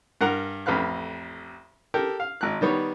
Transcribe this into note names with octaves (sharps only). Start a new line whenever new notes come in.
G2 A#4 F#5 A#5
A1 F2 B4 F5 F#6
G4 A4 A#4
F5
G#1 F#6
D#3 G3 B3 C#5